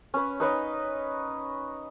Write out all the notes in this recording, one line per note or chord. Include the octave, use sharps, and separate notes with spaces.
C#4 B4
D#4 B4 C#5 D#5